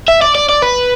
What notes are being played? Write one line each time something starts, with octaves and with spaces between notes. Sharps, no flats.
E5
D5
D5
D5
B4